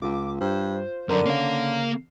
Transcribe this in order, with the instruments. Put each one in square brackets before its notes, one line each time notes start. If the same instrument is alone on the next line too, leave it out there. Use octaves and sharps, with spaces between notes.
[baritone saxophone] C#2 [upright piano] F4 [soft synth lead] D6
[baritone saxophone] G2 [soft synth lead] C5
[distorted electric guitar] F#2 [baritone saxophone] D3 [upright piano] A#4 D5
[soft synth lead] C#3 [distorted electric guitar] A#3 F5 [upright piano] C#4